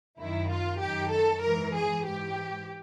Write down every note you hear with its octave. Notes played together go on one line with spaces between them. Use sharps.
F#2 D#3 E4
F4
F#2 D#3 G4
A4
G#2 E3 A#4
G#4
G#2 E3 G4